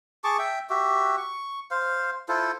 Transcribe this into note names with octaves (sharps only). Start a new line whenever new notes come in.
G#4 A5 C#6 D6
E5 G5
F#4 G4 E5
C#6
C5 F5
E4 F4 A4 C5